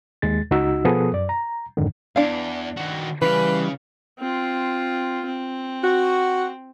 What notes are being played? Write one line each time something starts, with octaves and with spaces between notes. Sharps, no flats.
D#2 G#3 A6
C#2 D#4 F#4 E6
B2 F3 B3 G#4 A4 D#6
F#2 D5
A#5
F2 G#2 D3 D#3
E2 D4 F5
D#3 F#4
C#3 E3 G3 B4 F5
C4 F4
C4
F#4